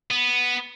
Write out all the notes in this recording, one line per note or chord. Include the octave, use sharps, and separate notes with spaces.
B3